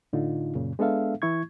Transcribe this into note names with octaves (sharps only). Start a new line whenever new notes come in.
A2 D3 D#4 F4
F#2 A#2 C#3
G#3 B3 D4 A4 E5 F5
E3 E4 C#6 G#6